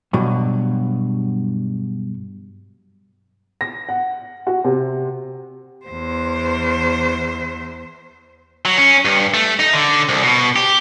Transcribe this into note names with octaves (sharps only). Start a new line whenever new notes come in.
G2 B2 F#3
A#6
F#5
F#4
C3
E2 C5
F#3
C#4
G2
A3
D#4
D3
C2
B2
G4